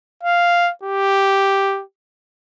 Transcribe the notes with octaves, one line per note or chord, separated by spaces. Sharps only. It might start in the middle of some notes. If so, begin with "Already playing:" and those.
F5
G4